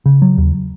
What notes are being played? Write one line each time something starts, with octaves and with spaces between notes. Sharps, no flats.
C#3
F#3
D#2